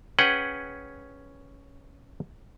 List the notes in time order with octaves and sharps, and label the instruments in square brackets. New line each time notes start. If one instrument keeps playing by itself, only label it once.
[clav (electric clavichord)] C#4 G#4 B4 F#5 G5